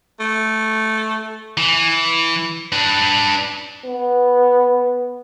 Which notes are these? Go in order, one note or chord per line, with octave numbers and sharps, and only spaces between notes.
A3
E3
D4 B4
B3